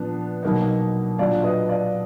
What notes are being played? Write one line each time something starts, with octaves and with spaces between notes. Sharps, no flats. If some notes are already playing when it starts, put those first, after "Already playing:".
Already playing: A#2 F3 B3 D4
B2 F#3 A#3 D#4
A#2 F#3 D4 D5 F5
B4 D#5
D5 F5